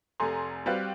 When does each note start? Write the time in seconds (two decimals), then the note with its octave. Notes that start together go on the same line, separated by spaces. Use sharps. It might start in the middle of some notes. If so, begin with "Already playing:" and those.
0.20 F1 A3 G#5 A#5 C6
0.66 G3 C4 F#4 G4 B4 F5